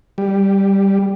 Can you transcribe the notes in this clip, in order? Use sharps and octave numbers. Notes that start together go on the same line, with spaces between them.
G3